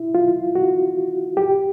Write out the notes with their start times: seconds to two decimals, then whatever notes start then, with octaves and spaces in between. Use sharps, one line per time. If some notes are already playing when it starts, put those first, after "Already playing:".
Already playing: E4
0.15 F4
0.55 F#4
1.37 G4